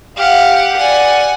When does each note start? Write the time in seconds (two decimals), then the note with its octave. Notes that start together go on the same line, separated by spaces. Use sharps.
0.17 G4 F5 F#5
0.76 D5 F#5 G#5